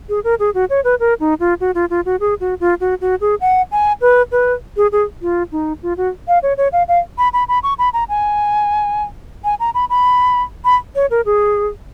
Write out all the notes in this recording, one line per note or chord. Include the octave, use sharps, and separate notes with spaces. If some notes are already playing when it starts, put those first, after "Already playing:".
G#4
A#4
G#4
F#4
C#5
B4
A#4
D#4
F4
F#4
F4
F4
F#4
G#4
F#4
F4
F#4
F#4
G#4
F#5
G#5
B4
B4
G#4
G#4
F4
D#4
F4
F#4
F5
C#5
C#5
F5
F5
B5
B5
B5
C#6
B5
A#5
G#5
G#5
A#5
B5
B5
B5
C#5
A#4
G#4